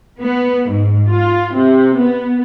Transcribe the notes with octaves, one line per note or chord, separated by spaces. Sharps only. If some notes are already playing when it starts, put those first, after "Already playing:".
B3
G#2
F4
C3
B3